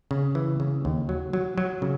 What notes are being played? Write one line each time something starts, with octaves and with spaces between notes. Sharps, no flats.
C#3
E3
C#3
D#2
F#3
F#3
F#3
C#3